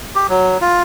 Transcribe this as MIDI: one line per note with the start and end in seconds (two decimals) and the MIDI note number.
0.15 0.27 67
0.29 0.57 54
0.61 0.83 65